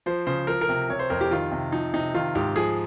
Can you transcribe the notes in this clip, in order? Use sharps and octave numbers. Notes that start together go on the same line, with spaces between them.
F3 C5
C#3 C5
F3 A#4
A#4
C3
C3 C#5
C5
F2 A#4
G4
D#3 F4
C3
F3 D#4
C3 D#4
D#3 F4
G#2 G4
F3 G#4